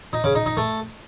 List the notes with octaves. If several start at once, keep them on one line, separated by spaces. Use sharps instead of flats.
D#4
C#3
D#4
D#4
A3